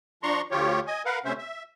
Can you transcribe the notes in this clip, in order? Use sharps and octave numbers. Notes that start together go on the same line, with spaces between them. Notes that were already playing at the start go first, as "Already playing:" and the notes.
F3 D4 A#5 C6 C#6
D2 F3 F4 G4 C#5
D#5 G#5
A#4 B4 F5 F#5
D2 C3 C#4 C5 E5
E5